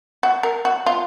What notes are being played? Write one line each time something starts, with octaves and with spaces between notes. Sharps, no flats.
F#4
A#4
F#4
F4